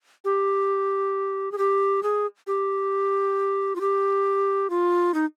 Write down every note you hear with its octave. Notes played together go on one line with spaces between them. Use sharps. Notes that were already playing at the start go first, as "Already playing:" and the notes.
G4
G#4
G4
G#4
G4
F4
G4
F4
D#4